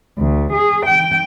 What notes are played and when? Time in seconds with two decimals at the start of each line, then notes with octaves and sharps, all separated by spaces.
0.18 D2
0.53 G#4
0.86 G5